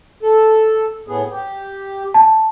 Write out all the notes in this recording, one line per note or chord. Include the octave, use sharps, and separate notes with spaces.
A4
A2 B3 G#4
G4
A5